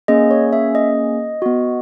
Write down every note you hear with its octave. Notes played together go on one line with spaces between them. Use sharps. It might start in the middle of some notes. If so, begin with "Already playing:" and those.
A#3 C#4 G#4 D#5
C#5
E5
D#5
B3 F#4